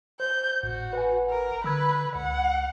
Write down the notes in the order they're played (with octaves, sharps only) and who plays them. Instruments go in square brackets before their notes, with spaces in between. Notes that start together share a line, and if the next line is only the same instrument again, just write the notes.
[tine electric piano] C5 [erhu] G6
[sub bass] G#1 [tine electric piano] A2 [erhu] F#4
[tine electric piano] B4 F#5 G#5
[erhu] A#4
[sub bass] D3 [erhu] B4 [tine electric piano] B5 E6 G#6
[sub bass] C#2 [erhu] F#5